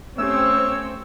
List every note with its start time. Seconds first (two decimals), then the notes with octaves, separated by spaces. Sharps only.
0.18 A3 C4 C#4 G4 C#5 E6